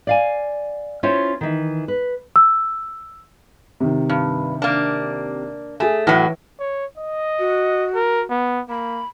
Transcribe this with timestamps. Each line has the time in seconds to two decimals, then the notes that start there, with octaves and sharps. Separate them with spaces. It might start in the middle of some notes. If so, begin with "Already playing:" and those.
0.07 D5 F5 G#5
1.03 C#4 E4 F4 C5 C#5
1.41 D#3 E3
1.88 B4
2.36 E6
3.80 C3 D#3
4.09 G2
4.62 A#3 D4
5.80 A3 G#4 G#5
6.07 A2 E3 F#3
6.60 C#5
6.98 D#5
7.39 F#4
7.95 A#4
8.30 B3
8.69 A#3 B5